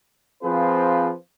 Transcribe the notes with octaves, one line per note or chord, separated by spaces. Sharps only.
F3 C4 F4 G#4 B4